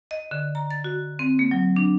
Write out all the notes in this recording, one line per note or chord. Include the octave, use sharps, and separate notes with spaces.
D#5
D3
A#5
A6
F#4
C4
A#3
F#3
D4